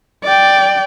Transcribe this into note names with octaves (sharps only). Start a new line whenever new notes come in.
D5 G5